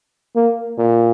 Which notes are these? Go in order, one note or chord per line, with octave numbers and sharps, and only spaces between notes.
A#3
A#2